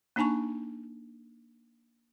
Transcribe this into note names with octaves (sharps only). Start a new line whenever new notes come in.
A#3 D4 D#4 G#5 A5 C#6